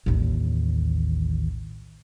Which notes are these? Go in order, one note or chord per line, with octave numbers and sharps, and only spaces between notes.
A1 D#2